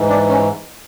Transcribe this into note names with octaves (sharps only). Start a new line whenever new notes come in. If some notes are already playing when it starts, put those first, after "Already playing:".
Already playing: G#2 E3
D4
C#4